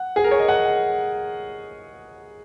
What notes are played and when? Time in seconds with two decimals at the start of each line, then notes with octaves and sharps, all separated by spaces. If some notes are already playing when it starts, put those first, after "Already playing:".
Already playing: F#5
0.16 G#4
0.24 A#4
0.31 C#5
0.39 D#5
0.48 F#5